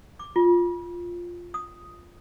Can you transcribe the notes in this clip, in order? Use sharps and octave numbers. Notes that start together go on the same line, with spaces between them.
D6
F4
D#6